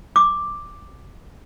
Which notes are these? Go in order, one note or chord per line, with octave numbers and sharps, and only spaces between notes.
D6